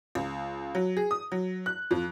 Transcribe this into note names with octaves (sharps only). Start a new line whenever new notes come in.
C#2
F#3
G#4
D#6
F#3
F#6
F2